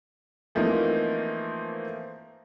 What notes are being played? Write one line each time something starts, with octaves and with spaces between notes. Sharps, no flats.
E3 F3 A3 A#3 C4 D#4